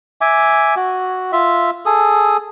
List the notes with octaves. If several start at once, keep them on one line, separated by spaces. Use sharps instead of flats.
E5 G#5 D6
F#4
F4 E5
G#4 A4 D#6